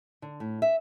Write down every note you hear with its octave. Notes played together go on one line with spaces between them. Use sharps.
D3
A2
E5